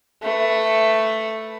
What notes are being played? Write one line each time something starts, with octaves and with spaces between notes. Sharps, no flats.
A3 B4